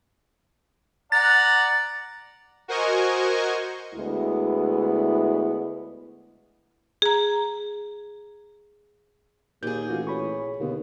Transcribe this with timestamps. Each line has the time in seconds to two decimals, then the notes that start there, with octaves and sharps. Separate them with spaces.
1.12 D5 F#5 A#5 A6
2.68 F#4 A#4 C5 D#5 G#5 C#6
3.94 D2 G#3 B3 E4
7.02 G#4 A#5
9.63 D#2 A#2 G#4 G6
9.89 A1 F4 F#4
10.07 C#5 B5 C#6
10.60 D#2 B2 D3 B3